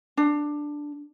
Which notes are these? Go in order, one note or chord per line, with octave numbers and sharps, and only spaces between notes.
D4